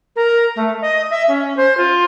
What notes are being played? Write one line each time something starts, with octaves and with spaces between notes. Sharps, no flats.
A#4
A3
D#5
E5
C#4
C5
F4